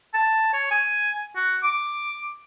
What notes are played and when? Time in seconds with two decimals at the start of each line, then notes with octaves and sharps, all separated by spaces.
0.14 A5
0.53 C#5
0.71 G#5
1.36 F#4
1.63 D6